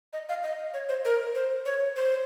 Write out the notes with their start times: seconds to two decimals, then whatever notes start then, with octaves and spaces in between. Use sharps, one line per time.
0.13 D#5
0.29 F5
0.43 D#5
0.74 C#5
0.89 C5
1.05 A#4
1.35 C5
1.66 C#5
1.96 C5